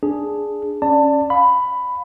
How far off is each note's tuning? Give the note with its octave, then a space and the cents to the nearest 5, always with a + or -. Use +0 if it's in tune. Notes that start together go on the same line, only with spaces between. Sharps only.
D4 +0 G#4 +0
C#4 +0 D5 +0 A5 +20
F5 +35 B5 +10